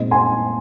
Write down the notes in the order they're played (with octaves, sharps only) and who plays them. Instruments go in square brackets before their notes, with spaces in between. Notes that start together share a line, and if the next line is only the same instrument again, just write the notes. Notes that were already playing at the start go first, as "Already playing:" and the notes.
Already playing: [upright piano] A#2 G#3 C4 D#4 D#5
G#5 C6